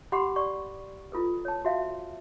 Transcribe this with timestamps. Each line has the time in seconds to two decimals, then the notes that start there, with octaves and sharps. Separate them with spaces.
0.12 G4 F#5 B5 C6 D6
0.36 D5 C#6
1.12 E4 F4 A4 B4
1.45 C#5 A5
1.65 F#4 E5 F5